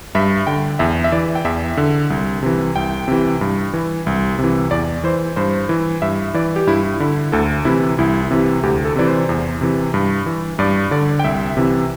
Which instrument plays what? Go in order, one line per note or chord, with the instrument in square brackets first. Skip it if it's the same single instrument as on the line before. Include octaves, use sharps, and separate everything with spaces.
[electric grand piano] G2 E5
D3 G5
E2 E5
E5
E3 D5
G5
E2 E5
D3
C2
C3 E3
C2 G5
C3 E3
G2
E3
C2
C3
E3
E2 D5
E3 C5
G2 C5
E3
G2 E5
E3 D5
G4
G2 E4
D3 E4
D2 A4
C3 E3 E4
C2 E4
C3 E3
D2 G4
A4
C3 E3 D5
C5
E2
C3 E3
G2
E3
G2 D5
D3 D5
G5
C2 E5
C3 E3